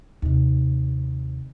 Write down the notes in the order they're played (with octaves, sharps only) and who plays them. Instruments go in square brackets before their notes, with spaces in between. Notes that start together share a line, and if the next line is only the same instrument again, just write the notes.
[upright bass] D#2 C3